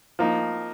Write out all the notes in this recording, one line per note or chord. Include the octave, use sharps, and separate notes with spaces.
F3 A#3 D#4